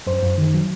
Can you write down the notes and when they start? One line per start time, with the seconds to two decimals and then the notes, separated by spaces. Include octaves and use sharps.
0.07 F#2 C5
0.23 F#2
0.38 D#3
0.54 F#3